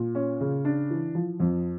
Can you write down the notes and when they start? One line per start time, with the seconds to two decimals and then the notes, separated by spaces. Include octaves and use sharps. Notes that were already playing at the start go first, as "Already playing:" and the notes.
Already playing: A#2
0.15 C#4
0.41 C#3
0.65 D4
0.90 E3
1.15 F3
1.40 F2